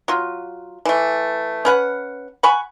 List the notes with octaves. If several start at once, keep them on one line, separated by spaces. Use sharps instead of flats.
F#3 F4
E3 A3
C#4 B4 F#5
F#5 G#5 B5 C#6